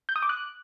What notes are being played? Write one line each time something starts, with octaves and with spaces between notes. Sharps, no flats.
G6
D#6
D6
F#6